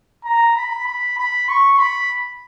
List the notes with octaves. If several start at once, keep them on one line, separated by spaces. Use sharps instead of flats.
A#5
B5
B5
B5
C#6
B5